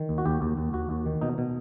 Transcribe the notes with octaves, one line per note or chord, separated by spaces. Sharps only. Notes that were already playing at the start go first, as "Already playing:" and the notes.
Already playing: D#3
D#2
F#4
D#2 G4
D#2
D#2
D#2 F#4
D#2
D#3
B2 D#4
B2